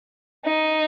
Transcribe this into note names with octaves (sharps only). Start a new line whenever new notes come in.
D#4